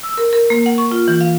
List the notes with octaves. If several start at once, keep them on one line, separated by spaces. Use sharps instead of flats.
E6
A#4
A#4
A#3
F#5
C#6
F4
E3
F5